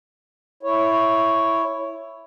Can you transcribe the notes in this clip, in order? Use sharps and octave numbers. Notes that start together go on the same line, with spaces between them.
E4 C#5